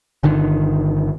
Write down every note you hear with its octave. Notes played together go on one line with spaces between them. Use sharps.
G1 D3 D#3